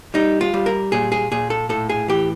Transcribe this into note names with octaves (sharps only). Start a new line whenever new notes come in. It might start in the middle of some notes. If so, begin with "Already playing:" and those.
G3 D#4
F4
G3
A#4
A#2 G#4
G#4
A#2 G#4
A4
A2 A4
G#4
E3 G4